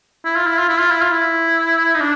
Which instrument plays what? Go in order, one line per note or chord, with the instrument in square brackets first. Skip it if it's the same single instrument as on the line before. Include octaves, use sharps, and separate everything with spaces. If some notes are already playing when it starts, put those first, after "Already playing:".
[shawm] E4
F4
E4
F4
E4
F4
E4
F4
E4
D#4
D4